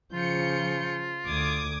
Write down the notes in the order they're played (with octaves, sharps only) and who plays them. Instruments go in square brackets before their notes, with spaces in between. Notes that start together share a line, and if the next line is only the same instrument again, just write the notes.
[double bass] C#3 F3 [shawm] F4 [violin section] G6 C#7
[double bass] D2 [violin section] D6 D#6 G#6